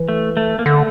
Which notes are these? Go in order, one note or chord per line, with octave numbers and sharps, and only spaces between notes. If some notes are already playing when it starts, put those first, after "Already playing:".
Already playing: E3
A3
A3
A#3
D3 A3